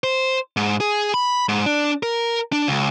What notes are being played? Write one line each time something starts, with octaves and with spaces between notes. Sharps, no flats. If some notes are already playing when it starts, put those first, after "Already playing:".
C5
G#2
G#4
B5
G#2
D4
A#4
D4
C#2